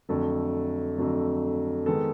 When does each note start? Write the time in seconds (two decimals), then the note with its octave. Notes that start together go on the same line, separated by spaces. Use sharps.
0.09 F2 D3 F#3 A3 A4
0.98 F2 D3 F#3 A3
1.86 D#3 G#3 B3 A4